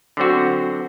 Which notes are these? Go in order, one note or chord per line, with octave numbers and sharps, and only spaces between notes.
D3 F#3 C4 F#4